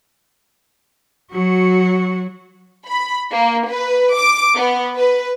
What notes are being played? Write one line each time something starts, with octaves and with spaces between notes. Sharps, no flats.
F#3 F#4
B5
A#3
B4
D6
B3
B4